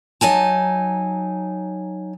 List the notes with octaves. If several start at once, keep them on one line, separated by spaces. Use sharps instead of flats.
F#3 D#4 G#5 A5